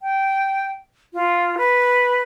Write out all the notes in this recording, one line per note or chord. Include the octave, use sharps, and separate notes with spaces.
G5
F4
B4